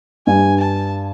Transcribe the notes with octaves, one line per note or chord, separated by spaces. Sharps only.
G2 G#5
A5